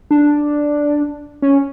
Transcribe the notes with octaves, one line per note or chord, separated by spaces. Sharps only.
D4
C#4